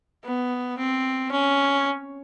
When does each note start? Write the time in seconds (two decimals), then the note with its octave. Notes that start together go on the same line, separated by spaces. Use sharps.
0.24 B3
0.79 C4
1.32 C#4